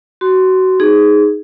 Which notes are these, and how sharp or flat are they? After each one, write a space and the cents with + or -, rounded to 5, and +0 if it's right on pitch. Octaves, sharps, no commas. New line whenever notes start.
F#4 +20 C6 -10
D#4 +0 G#4 +0